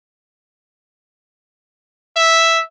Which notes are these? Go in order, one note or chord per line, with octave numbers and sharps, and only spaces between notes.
E5